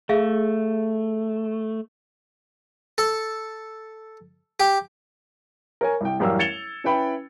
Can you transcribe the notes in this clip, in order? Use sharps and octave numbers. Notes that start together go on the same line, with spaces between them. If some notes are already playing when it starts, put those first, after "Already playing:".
A3 G#4 E5 F5
A4
G4
A#4 C#5 G#5
C2 G5
A1 F#2 G3 A#4 F5 E6
G#6 A6 C#7 E7 F7 G7
C#4 E4 B4 G5 B5